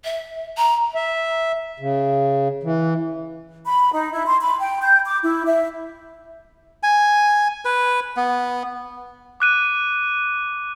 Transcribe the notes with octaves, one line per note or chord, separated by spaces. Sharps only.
E5
A#5
E5
C#3
E3
B5
D#4
E4
C6
B5
G5
G6
D6
E4
E5
G#5
B4
B3
D6 F#6 D#7